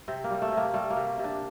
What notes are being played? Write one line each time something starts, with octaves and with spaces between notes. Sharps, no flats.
C3 C4
A#3
G3
A3
C3
A#3
G3 A3
A#3
C3
C3
D4